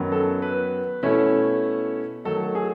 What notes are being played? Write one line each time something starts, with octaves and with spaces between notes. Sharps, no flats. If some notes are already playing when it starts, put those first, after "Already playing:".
Already playing: F#2 D#3 F#3 B3
A4
B4
B2 A3 C#4 E4
D#3 F#3 A3 A4
G#4